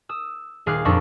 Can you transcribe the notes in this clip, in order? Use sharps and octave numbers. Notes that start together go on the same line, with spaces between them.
D#6 E6
D#1 G#4 F5 D6 F#6
F2 A#2 D4 D#4 C#6 E6